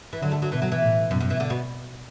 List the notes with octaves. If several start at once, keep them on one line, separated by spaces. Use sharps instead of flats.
E3
D3 F#3
A3
F#3
B2 E3
F#3
E3
A2
F#2 B2
F#2
E3
D3
B2